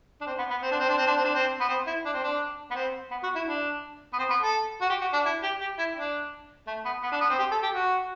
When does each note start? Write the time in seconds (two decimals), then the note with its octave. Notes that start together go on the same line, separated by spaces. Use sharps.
0.21 D4
0.27 C4
0.39 B3
0.51 B3
0.62 C4
0.72 D4
0.80 C4
0.89 D4
0.98 C4
1.07 D4
1.16 C4
1.25 D4
1.34 C4
1.61 B3
1.69 C4
1.87 E4
2.05 D4
2.14 C4
2.24 D4
2.71 B3
2.76 C4
3.11 B3
3.23 F#4
3.36 E4
3.47 D4
4.13 B3
4.18 C4
4.30 B3
4.42 A4
4.82 F#4
4.90 G4
5.01 F#4
5.13 D4
5.26 E4
5.43 G4
5.61 G4
5.79 E4
5.97 D4
6.67 A3
6.85 B3
7.03 B3
7.12 D4
7.21 B3
7.30 C4
7.39 G4
7.51 A4
7.63 G4
7.75 F#4